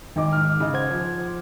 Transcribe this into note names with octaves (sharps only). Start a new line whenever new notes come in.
G#1 D#3 D#4 D6
G#2 F6
C#3 D#4
C5 F#5 G#6
F3